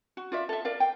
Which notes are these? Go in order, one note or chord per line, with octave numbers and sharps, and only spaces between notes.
F#4
F4 D5 E5
A4 E5
A#4 D5 F5
G5